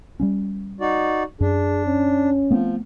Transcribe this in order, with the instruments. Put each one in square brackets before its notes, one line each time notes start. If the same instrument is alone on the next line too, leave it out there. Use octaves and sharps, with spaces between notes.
[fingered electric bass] G3 A#3 C#4
[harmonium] D#4 F#4 D5
[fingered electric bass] F#2 [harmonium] D4 [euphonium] G#4
[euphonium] C#4
[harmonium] F3 [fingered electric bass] A3 B3 C4